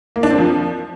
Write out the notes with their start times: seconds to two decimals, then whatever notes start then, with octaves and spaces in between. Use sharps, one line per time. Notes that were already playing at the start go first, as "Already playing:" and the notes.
0.16 A#3
0.23 D4
0.31 C4
0.38 F3